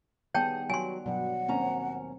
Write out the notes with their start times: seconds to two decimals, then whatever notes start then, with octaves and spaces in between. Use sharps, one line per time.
0.34 D#3 G3 B3 G#4 C#5 G5 A5
0.70 F#3 G3 G#5 C6
1.06 G2 B2 F#3 F#5
1.48 D#2 C4 C#4 A#5